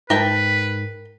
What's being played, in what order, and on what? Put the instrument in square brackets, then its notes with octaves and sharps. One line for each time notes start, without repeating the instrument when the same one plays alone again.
[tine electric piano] G#2 [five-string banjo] A#4 G5 A5 [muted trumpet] B4